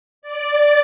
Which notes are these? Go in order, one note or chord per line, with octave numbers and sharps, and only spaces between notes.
D5